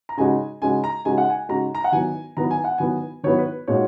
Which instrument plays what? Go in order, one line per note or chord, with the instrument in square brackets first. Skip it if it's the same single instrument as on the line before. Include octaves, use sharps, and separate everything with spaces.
[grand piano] A#5
[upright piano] C#3 G#3 D#4 F#4 [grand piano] G#5
[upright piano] C#3 G#3 D#4 F#4 [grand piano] G#5
[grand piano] A#5
[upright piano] C#3 G#3 D#4 F#4 [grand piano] G#5
[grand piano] F#5
G#5
[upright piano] C#3 G#3 D#4 F#4 [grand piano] A#5
[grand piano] A#5
F#5
[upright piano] D#3 F#3 B3 E4 [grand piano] G#5
[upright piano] D#3 F#3 B3 E4 [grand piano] A#5
[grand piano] G#5
F#5
[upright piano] D#3 F#3 B3 E4 [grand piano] G#5
[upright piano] D#3 F#3 B3 E4 [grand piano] C#5
[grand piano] B4
[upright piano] A#2 G#3 D#4 F#4 [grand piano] C#5